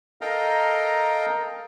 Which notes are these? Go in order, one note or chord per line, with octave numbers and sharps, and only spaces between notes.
A4 A#4 D#5 F5 G5 A#5